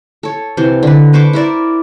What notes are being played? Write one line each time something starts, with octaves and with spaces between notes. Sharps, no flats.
A4 C#5
C3 E3
D3 B4
B4 C5 C#6 D6
E4 A#4 D5 E5